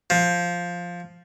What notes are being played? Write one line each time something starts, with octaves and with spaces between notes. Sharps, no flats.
F3